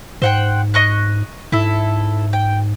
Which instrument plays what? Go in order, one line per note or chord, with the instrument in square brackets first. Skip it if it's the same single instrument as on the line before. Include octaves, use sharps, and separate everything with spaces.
[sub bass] G#2 [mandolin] C5 F#5 G5
[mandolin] D#5 C#6 F#6
[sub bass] G#2 [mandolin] E4 A4
[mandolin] G5